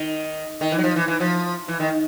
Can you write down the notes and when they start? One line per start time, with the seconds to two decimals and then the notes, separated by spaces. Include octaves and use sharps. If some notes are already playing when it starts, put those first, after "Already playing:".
Already playing: D#3
0.61 D#3
0.72 E3
0.78 F#3
0.84 F3
0.96 E3
1.08 E3
1.20 F3
1.68 E3
1.80 D#3